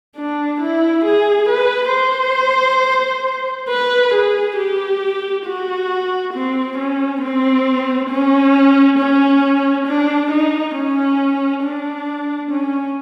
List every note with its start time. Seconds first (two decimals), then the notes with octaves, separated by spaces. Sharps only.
0.17 D4
0.60 E4
1.05 G#4
1.49 B4
1.93 C5
3.69 B4
4.14 G#4
4.57 G4
5.46 F#4
6.34 C4
6.78 C#4
7.22 C4
8.10 C#4
8.98 C#4
9.86 D4
10.31 D#4
10.75 C#4
11.63 D4
12.51 C#4